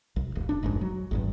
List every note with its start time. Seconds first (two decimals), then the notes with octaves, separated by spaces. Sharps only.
0.16 B1
0.35 D1
0.49 D#1 D4
0.63 F1 A#1 G#2
0.81 F#3
1.11 G#1 E2 G2